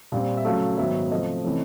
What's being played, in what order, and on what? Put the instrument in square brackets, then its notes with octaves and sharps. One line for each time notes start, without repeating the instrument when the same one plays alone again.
[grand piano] A#2 G3 C4
E5
C#3 F#3 A3 F5
G#2 D#3 F#3 B3 E5
C3 F3 A3 D#5
C3 E3 A3 C#4